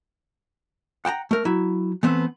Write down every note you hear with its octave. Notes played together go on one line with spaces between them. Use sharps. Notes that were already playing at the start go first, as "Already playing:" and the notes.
F#5 G5 A5 A#5
A3 A#4
F#3 E4
E3 A3 B3 C4